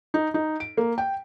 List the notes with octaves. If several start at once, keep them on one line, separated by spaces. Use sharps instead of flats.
D#4
D#4
D7
A#3
G5